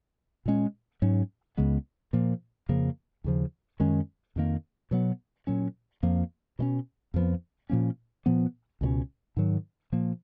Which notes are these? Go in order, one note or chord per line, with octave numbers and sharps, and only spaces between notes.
A#2 G#3 C#4
G#2 F#3 C#4
C#2 C#3 G#3 B3
A#2 F3 A#3
F2 C#3 F3 A#3
D#2 C#3 F3
F#2 D#3 G#3 C#4
F2 D#3 A#3
B2 F#3 B3
A#2 F#3 C#4
F2 F3 A#3
B2 G#3 C#4
F2 F3 B3
A#2 F3 A#3 C#4
A#2 F3 B3
C#2 B2 G#3 C#4
G#2 D#3 F#3
A#2 F3 A#3